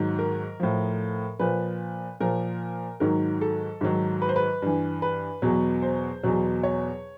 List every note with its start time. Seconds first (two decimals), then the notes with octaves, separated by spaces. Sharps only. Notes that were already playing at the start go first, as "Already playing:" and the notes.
Already playing: G#2 D#3 F#3
0.19 A#4
0.60 A2 F3
1.39 A#2 F3 B4
2.20 A#2 F3 A#4
3.00 G#2 D#3 F#3 A#4
3.41 A4
3.81 G#2 D#3 F#3
4.22 B4
4.29 C5
4.36 B4
4.62 G2 E3
5.02 B4
5.42 E2 B2 F#3
5.82 C5
6.23 E2 B2 F#3
6.63 C#5